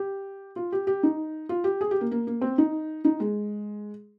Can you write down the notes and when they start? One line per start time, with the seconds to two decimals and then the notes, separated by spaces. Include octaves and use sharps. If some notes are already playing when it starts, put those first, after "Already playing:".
Already playing: G4
0.56 F4
0.72 G4
0.87 G4
1.03 D#4
1.49 F4
1.64 G4
1.81 G#4
1.91 G4
2.01 A#3
2.11 A#3
2.27 A#3
2.41 C4
2.58 D#4
3.05 D#4
3.20 G#3